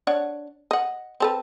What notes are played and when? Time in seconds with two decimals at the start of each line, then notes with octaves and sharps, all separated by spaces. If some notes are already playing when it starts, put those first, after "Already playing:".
0.07 D4 C#5 F#5
0.71 D#5 F#5
1.20 C4 A4 B4